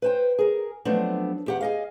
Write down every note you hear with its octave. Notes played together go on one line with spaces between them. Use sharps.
B4 C5 G5
G#4 A#4
F3 F#3 A3 B3 C4 D4
E2 G4 F#5
G#4 D#5 F5